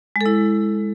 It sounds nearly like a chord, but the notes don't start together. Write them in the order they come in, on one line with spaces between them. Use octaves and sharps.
G#3 A4 E4